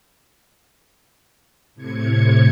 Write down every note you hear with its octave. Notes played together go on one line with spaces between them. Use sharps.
A2 C3 G#6 C#7